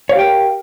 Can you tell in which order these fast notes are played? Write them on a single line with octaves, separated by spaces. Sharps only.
C#5 F5 G4 G5 A#4